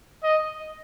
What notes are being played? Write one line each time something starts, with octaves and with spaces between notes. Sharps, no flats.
D#5